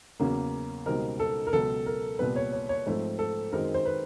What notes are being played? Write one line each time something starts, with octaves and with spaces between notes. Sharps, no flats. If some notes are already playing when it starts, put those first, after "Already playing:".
E2 C#3 F#3 A#3 C#4
C#2 B2 G3 C4 D#4 A#4
A4
A#4
C#2 B2 F#3 B3 A4
A#4
C2 A#2 G3 B3 B4
C#5
C#5
C#5
G#2 F3 A3 C4
A4
F#2 D#3 G#3 C4 D#4 A#4
C5
B4